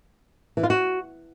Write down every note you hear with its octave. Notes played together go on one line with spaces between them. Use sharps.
E3
F4
F#4